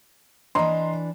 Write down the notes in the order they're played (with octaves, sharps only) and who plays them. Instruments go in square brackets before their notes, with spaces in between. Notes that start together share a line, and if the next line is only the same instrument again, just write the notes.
[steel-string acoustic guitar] E3 D4 [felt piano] D#5 A#5 C6